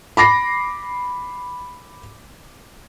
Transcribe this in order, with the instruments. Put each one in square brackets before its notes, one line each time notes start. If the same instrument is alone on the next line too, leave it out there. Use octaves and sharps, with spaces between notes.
[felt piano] B5 D6 A#6 C7